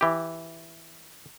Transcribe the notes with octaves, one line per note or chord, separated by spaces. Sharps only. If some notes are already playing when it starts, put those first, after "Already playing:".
E3 G4